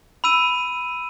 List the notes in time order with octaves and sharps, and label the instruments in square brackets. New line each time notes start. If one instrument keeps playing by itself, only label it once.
[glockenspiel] B5 E6 D#7